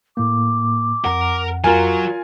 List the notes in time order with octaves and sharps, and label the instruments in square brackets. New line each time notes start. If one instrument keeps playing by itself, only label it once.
[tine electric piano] A2 A#3 [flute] D6
[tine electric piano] F2 F#5 [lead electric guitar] A#4
[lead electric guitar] F#3 [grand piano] F4 A#4 G#5